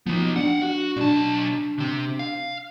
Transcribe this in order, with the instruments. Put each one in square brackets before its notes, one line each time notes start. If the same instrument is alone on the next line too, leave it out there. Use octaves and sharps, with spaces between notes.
[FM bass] F3 [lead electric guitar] B3 D#4
[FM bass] D4 [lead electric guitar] F5 F#5
[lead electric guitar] F#4
[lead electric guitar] B1 A5 [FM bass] D4
[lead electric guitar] C3 C4
F5